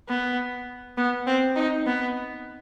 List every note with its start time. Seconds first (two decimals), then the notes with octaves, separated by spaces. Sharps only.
0.08 B3
0.98 B3
1.27 C4
1.56 D#4
1.86 B3